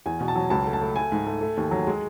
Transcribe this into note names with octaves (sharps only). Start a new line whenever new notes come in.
E2 G#5
B2
A5
F#3
C#2 A5
A3
A5
A3
A3 G#5
G#2
A3
A3
D#2
F#3
G#3